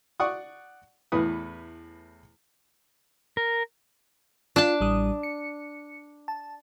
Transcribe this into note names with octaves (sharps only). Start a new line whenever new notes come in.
D5 F#5 C#6 D#6
E2 A2 B4 D#6
A#4
D4 F4 A5
A1 G3 D#6
C#7
A5